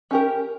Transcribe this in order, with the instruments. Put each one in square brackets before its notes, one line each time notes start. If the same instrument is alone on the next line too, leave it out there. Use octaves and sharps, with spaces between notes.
[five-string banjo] C#4 G4 A#4